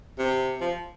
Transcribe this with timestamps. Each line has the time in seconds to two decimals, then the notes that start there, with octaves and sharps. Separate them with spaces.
0.18 C3
0.60 F3